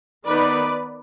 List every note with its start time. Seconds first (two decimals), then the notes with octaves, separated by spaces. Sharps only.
0.24 D#3 B3 D#4 B4 D5